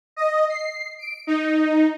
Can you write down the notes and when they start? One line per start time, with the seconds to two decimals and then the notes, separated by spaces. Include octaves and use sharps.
0.16 D#5
0.49 C7
0.99 D7
1.27 D#4